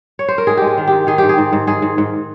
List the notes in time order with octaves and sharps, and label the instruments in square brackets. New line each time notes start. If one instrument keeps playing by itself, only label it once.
[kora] C#5
C5
A#4
G#2 G#4
G#3 G4
G#4
D#3
G#2 G4
D#3 G#4
G#2 G4
G#4
G#2
G#2
G#2 G#4
G#2
G#2